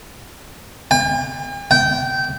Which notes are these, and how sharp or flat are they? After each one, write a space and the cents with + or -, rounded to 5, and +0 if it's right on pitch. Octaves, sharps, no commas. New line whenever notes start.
G5 +45
G5 -20